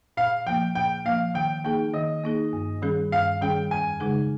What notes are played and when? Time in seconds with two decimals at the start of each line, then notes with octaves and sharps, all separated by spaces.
0.17 A#2 F5
0.46 F3 A#3 G5
0.75 A#2 G5
1.05 F3 A#3 F5
1.34 D#3 G5
1.64 A#3 D#4 G#4 G5
1.94 D#3 D#5
2.24 A#3 D#4 G#4
2.53 G2
2.82 D#3 G3 C#4 G#4
3.12 G2 F5
3.41 D#3 G3 C#4 G#4 G5
3.71 F2 G#5
4.00 C#3 G#3 D#4 G#4